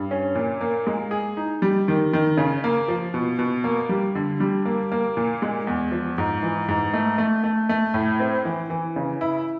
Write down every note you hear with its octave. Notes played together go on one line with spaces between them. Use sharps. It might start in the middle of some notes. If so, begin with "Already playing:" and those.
Already playing: G2
C#4
A#2
A#3
G#3
G#4
D#4
G3
D#3
D#3
C#3
A#3
F3
B2
B2
A#3
G3
D3
G3
A#3
A#3
A#2
G#3
E2
F3
G#2
E3
G#2
A3
A3
A3
A3
A2
C4
E3
E3
C#3
E4